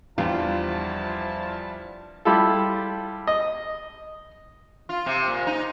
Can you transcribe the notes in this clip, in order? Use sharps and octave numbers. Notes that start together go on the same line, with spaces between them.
E2 F3 G3 D4 E4 F4 G5 A5
G3 E4 F4 A4
D#5
F4
C3
A#2
D#4